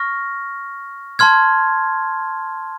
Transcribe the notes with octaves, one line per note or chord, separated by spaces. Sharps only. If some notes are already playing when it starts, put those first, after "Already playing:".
Already playing: C#6 F6 A#6
A5 C6 F6 G#6